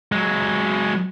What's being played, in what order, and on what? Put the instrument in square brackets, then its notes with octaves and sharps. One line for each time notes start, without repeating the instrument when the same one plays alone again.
[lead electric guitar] F#3 G#3